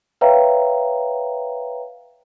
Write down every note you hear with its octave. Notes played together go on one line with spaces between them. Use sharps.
B4 C#5 E5 F5 G5 A#5